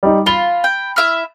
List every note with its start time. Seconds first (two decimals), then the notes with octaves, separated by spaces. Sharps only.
0.03 G3 D#4
0.26 F4 B5 G7
0.64 G5
0.96 E4 E5 F6